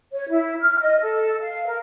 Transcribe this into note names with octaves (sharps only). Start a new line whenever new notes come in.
C#5
E4
F6
D#5
A4
F5
A#4